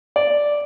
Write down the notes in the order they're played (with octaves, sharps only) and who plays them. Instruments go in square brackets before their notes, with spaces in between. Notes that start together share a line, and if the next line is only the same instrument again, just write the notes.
[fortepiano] D5